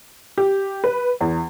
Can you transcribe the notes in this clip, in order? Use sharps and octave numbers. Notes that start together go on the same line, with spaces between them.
G4
B4
E2